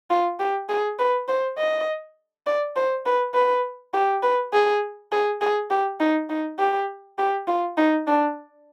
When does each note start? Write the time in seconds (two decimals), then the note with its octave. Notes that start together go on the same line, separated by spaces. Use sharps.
0.10 F4
0.39 G4
0.69 G#4
0.99 B4
1.28 C5
1.58 D#5
2.46 D5
2.76 C5
3.05 B4
3.34 B4
3.94 G4
4.23 B4
4.53 G#4
5.12 G#4
5.41 G#4
5.70 G4
6.00 D#4
6.30 D#4
6.59 G4
7.18 G4
7.47 F4
7.77 D#4
8.07 D4